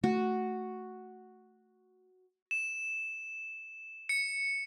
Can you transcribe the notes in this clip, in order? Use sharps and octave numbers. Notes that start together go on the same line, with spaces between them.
A3 F#4
E7
C#7